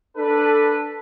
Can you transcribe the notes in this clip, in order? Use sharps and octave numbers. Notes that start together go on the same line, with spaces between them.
D4 A4 B4